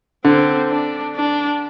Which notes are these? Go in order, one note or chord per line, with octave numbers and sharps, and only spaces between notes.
D3 C4
D4
D4